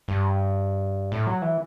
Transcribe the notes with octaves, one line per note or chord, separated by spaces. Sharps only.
G2
A2
F#3
E3